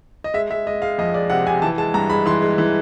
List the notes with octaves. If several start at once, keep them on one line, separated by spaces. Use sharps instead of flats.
D#5
G#3 E5
G#3 E5
G#3 D#5
G#3 F5
F2 D#5
G#3 D5
C3 F#5
C3 G#5
E3 A5
G#3 A5
G2 A#5
G#3 B5
E3 C6
G#3
E3